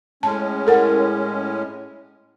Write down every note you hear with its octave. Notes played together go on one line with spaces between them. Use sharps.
A2 G#3 C#4 A5
A4 A#4 F#5